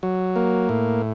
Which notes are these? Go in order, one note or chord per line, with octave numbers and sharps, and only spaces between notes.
F#3
A#3
A2